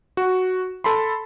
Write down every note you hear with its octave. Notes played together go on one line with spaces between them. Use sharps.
F#4
A4 A5 B5 C6